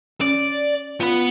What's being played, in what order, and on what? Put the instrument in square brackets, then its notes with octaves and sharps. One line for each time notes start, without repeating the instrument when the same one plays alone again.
[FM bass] C#4 [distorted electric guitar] D5
[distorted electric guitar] B3 B4 [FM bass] F4